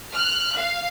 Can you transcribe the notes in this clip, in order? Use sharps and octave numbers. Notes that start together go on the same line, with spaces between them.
F6 F#6
F5